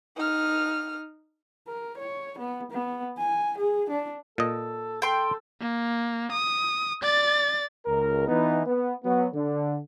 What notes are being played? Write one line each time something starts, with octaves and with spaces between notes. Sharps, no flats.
D#4 F6
A#4
C#5
B3
B3
G#5
G#4
D4
A#2 A4 D#5
A4 G5 C6
A#3
D#6
D5 A6
C#2 A#4
E3 B3 D#4
B3
F#3 B3
D3